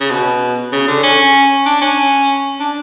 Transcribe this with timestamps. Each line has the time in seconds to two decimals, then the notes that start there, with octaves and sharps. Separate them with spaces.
0.01 C#3
0.10 B2
0.72 C#3
0.88 D3
1.03 C#4
1.66 D4
1.82 C#4
2.60 D4